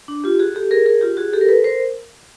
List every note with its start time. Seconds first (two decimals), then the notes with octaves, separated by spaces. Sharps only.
0.08 D4
0.24 F4 G4
0.39 F#4 G#4
0.55 G4 A4
0.71 G#4 A#4
0.86 G#4 A#4
1.01 F4 G4
1.17 F#4 G#4
1.33 G4 A4
1.41 A#4
1.48 A4 B4
1.64 A#4 C5